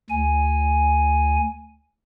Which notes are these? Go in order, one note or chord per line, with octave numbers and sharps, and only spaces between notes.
D2 G#5